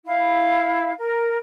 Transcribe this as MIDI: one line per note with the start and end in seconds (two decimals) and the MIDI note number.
0.05 0.92 64
0.05 0.92 77
0.98 1.36 70